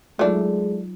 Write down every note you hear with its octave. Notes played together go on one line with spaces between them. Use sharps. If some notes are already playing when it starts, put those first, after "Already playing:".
F#3 G#3 A3 D4 D#4 F4